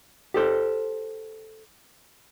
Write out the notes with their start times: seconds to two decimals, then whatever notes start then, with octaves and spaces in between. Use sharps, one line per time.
0.34 G4 A4 C5